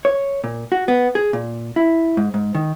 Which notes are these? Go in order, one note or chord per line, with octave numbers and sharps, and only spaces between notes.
C#5
A#2
F#4
B3
G#4
A#2
E4
G#2
G#2
D#3